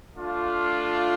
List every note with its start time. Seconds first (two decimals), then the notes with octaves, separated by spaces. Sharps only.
0.13 A3 D4 F4